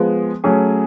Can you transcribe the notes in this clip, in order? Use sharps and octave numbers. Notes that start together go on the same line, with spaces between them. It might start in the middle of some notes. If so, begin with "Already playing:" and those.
Already playing: F3 G#3 B3
F#3 A3 C#4 G#4